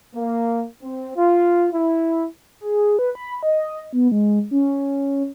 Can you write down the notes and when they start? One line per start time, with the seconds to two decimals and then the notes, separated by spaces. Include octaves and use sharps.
0.15 A#3
0.81 C4
1.15 F4
1.73 E4
2.61 G#4
2.99 B4
3.15 B5
3.43 D#5
3.93 B3
4.12 G#3
4.51 C#4